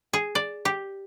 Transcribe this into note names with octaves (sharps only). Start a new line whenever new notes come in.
G#4
D5
G4